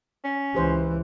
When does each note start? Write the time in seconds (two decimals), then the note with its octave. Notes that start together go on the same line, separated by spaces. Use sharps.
0.24 C#4
0.55 C#2 E3 G4 C5